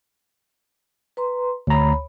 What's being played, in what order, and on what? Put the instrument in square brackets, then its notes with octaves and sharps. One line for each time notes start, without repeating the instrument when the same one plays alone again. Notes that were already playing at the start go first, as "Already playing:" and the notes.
[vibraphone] B4 A#5 C6
[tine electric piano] D2 A#5 [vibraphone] C#5 B5